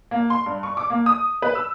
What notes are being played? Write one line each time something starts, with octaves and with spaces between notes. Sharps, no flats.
A#3
C6
G2
C#6
D6
A#3
D#6
B4
E6